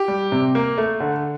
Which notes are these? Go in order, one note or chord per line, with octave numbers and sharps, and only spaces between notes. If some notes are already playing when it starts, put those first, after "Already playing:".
Already playing: G4
G3
C3
A#3
A3
D3